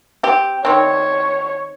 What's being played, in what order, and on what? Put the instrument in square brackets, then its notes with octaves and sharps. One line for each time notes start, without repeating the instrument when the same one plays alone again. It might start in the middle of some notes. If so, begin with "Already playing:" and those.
[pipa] C4 G4
[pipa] D#3 C4 [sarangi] C#5